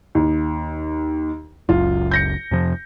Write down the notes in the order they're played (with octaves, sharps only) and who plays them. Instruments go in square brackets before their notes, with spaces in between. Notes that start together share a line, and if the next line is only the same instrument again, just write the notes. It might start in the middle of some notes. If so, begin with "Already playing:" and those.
[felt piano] D#2
[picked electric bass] F#1 C#2 F#2 [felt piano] F4
[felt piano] G6 A#6 C#7
[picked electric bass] F2 C3 F3